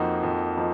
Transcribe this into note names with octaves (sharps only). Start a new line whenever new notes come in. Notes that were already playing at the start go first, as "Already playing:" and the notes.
Already playing: F2 F3 A#3 D#4 F#4
F2
F3 A#3 D#4